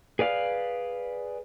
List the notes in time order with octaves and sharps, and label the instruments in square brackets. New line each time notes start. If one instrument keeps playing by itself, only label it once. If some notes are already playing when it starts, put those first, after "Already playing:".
[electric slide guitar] G#4 B4 D5 F5